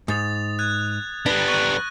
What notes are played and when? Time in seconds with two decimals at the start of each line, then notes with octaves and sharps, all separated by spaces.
0.08 G#2 D#6 A6 F7
0.59 F#6 G#6
1.26 G3 B3 D4 F#6 A#6
1.48 C#6 F#6